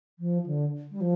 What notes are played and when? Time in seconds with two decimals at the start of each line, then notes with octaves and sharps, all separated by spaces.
0.19 F3
0.46 D3
0.91 G3
1.01 F3